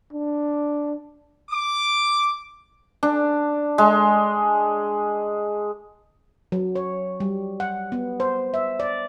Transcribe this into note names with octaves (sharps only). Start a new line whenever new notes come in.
D4
D6
D4
G#3
F#3
C#5
G3
F#5
B3
C5
E5
D5